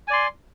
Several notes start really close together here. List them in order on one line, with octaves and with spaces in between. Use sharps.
G#5 D5 C6